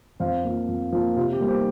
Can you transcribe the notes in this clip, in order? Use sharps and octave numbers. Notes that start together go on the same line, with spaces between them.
F2 C5 F5
F3 A#3
F2
F3 A#3
C3 F4
G4
G3 A#3
G4 C5